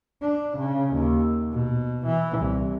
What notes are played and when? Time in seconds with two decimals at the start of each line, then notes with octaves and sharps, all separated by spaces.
0.21 D4
0.57 C#3
0.94 D#2
1.52 B2
2.06 E3
2.38 C2